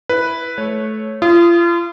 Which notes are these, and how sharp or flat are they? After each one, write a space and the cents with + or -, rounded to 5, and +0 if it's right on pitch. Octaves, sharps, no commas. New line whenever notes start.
E4 +0 B4 +0
A3 -20 C#5 -10
F4 -35 D#6 +0